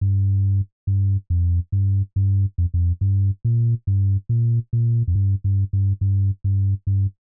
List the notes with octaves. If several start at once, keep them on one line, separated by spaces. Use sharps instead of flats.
G2
G2
F2
G2
G2
F2
F2
G2
A#2
G2
A#2
A#2
F2
G2
G2
G2
G2
G2
G2